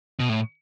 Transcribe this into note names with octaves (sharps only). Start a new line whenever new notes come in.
B2
A2